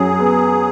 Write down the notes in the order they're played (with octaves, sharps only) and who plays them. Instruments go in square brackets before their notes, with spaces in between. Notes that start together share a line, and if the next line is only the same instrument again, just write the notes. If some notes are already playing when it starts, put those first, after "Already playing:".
Already playing: [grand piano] F#2 F#3 [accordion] G#4
[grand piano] B3